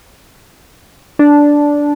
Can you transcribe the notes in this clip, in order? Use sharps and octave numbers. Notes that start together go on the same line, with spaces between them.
D4